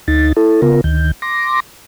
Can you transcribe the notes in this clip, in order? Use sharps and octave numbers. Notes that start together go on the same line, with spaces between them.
D2 D#4 A6
E4 A4
C#3 B3 F4 A#4
D2 D#3 G6
C6 D6 A#6